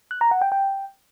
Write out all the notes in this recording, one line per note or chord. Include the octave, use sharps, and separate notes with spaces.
F#6
A#5
F#5
G5
G5